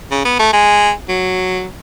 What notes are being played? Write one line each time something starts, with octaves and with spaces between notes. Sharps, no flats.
C#3
B3
A3
G#3
F#3